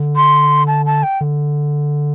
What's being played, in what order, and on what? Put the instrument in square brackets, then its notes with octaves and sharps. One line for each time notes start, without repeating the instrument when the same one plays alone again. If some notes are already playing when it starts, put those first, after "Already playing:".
Already playing: [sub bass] D3
[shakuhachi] C6
A5
A5
G5
[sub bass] D3